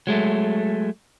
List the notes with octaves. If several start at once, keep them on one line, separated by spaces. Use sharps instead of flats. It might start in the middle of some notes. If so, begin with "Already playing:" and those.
F#3 G#3 A3